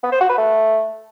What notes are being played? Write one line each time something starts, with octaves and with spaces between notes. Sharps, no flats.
B3
C5
F#4
B4
A3